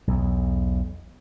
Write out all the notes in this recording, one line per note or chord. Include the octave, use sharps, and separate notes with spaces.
B1 E2